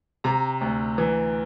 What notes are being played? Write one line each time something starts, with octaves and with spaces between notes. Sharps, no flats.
C3 A#5
D2
E3